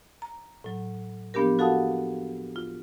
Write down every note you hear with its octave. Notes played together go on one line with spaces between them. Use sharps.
A#5
A2 F#3
F3 A#3 B3 D4 G4 A#4
F#4 A4 F5 F#5 A5 D#6
F4